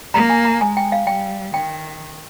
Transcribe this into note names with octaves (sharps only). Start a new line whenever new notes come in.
A#3 A#5
G#5
A#5
G#3 G#5
G5
F5
G3 G5
D#3 G5